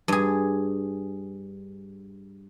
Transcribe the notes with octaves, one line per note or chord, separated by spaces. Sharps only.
G2 G#4